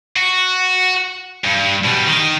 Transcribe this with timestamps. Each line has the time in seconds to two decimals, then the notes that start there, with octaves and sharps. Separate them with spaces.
0.16 F#4
1.45 G2
1.85 B2 G3
2.08 D#3